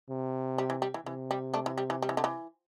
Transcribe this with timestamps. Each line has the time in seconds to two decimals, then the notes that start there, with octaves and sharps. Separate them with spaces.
0.10 C3
0.58 G3
0.70 E3
0.82 G3
0.94 E3
1.06 C3 E3
1.31 G3
1.54 A3 D4
1.66 E3
1.78 G3
1.90 E3
2.02 G3
2.09 E3
2.17 D3
2.24 E3